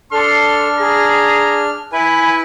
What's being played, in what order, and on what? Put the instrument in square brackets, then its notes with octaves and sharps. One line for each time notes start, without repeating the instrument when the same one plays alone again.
[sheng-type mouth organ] D4 F6 [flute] A4 [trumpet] C6
[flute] G#4 [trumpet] A#5
[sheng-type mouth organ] E4 B4 [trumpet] G#5 [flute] B5